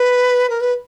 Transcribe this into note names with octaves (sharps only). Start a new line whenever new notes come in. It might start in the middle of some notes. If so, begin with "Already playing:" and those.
Already playing: B4
A#4
B4